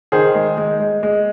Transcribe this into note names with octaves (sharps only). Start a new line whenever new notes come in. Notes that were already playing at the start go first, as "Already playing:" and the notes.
D#3 G#4 C5
G#3
G#3
G#3
G#3